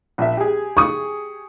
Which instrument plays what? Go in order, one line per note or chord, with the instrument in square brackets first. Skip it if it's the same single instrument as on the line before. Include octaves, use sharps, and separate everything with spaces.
[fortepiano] A#1 E5
G4 G#4
[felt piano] C#6 D#6